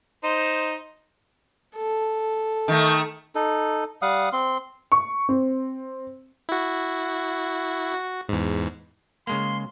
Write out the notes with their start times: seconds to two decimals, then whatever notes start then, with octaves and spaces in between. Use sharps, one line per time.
0.24 D#4 C5
1.76 A4
2.68 D#3 A3
3.35 D#4 A4
4.02 G3 F5 F#5 D#6
4.33 C4 C6
4.92 C#6
5.29 C4
6.49 E4 F#4
7.93 F#4
8.29 E2 G#2
9.27 C#3 G#3 A#3 C6